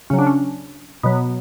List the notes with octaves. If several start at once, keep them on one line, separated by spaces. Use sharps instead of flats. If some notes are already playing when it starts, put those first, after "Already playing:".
C#3 F#3 C#4
D4
C#4
B2 F#3 B3